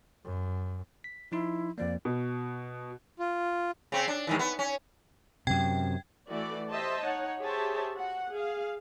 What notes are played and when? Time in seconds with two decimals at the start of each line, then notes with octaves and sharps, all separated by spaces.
0.25 F#2
1.04 B6
1.32 F3 D#4 E4 C6
1.78 F2 F3 A#3 D5
2.05 B2
3.19 F4
3.92 C#3 C4
4.08 D4
4.27 G2 D#3 E3
4.39 B3
4.59 C#4
5.47 F#2 C3 G5 G#6
6.28 E3 A3 F#4 D5
6.69 G4 C5 D#5 E5 A5
7.02 D#4 C#5 F#5
7.41 G4 G#4 C5 C#5 E5 A5
7.97 F#4 F#5
8.31 G#4 F5